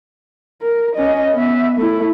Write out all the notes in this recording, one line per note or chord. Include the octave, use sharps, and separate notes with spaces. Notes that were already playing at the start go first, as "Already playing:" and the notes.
A#4
C#4 D#5
B3 E5
A3 E4